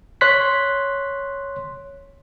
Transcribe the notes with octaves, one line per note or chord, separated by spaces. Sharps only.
C#5 C6 F#6 B6